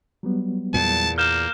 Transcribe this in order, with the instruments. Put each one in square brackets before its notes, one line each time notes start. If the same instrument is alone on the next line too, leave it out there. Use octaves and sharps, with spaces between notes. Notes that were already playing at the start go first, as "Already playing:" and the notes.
[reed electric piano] F#3 G3 B3
[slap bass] E2 A#2 [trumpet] A5
[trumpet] A#3 [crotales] F6 G6 E7